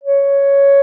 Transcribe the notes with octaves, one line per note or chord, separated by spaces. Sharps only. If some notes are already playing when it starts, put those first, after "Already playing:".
C#5